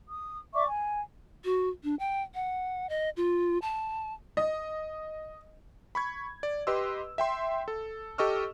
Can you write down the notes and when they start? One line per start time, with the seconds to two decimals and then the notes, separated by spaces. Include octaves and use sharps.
0.10 D#6
0.53 D5 E5 C#6 D6
0.66 G#5
1.45 F#4
1.84 D4
1.99 G5
2.35 F#5
2.89 D#5
3.17 F4
3.62 A5
4.37 D#5
5.95 B5 C#6 G#6
6.43 D5
6.67 G4 B4 D#5 C6 E6
7.18 E5 G5 C6
7.68 A4
8.18 G4 A4 D#5 C#6 E6 F6